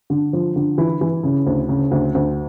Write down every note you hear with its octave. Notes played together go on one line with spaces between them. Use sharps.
D3
F3
D3
E3 E4
E3
C#3
D2
C#3
D2
D2